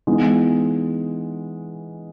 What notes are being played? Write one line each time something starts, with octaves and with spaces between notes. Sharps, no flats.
E3 G#3 B3 D#4